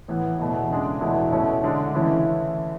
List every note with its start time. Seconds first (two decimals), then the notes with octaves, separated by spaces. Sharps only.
0.08 A2 E3 B3
0.39 E2 B2 A3 E4
0.70 C#3 G#3 D4
1.01 E2 B2 A3 E4
1.32 B2 A3 C#4 E4
1.64 D3 G#3 D4
1.94 C#3 E3 A3 C#4 E4